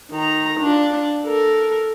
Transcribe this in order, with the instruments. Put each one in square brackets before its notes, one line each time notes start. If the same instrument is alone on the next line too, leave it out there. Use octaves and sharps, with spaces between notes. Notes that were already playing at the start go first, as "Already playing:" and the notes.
[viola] D#3 A#5
D4 F4
A4 A#4